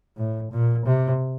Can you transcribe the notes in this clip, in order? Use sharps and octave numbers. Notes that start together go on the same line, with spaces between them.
A2
A#2
C3